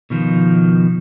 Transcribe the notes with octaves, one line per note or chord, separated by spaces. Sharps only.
B2 D#3 F3